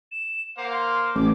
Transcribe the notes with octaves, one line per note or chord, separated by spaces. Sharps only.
E7
A#3 C5 F5 F#5
C6
A1 D6